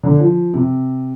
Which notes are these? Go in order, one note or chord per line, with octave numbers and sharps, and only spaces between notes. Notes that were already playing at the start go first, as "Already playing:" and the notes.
D3
F3
C3